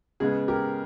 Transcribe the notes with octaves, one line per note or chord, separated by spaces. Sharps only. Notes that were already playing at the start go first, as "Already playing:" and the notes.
C#3 G#3 B3 G#4
G4 A#4